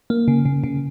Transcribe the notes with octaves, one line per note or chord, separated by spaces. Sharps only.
A#3
C#3
C#3
C#3